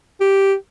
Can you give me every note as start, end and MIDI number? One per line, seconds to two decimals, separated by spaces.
0.20 0.54 67